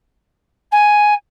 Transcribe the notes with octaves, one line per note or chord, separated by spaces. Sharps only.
G#5